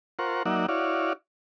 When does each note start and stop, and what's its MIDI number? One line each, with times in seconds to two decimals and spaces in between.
0.19 0.43 65
0.19 0.43 70
0.19 0.43 72
0.19 0.43 78
0.19 0.43 85
0.46 0.66 54
0.46 0.66 58
0.46 0.66 63
0.46 0.66 74
0.46 0.66 76
0.46 0.66 78
0.68 1.13 64
0.68 1.13 66
0.68 1.13 73
0.68 1.13 74
0.68 1.13 77